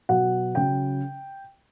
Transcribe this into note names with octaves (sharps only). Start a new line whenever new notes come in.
B2 F#3 F#5
C#3 F#3 G5